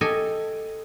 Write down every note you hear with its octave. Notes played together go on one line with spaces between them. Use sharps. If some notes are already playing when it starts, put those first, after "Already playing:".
G4 A4 D#5 G#5